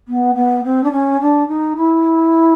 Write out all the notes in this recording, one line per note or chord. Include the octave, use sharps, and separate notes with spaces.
B3
B3
C4
D4
C#4
D4
D#4
E4